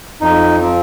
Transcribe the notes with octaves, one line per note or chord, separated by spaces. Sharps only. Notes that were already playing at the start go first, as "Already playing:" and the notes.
F2 D#4
F3 C4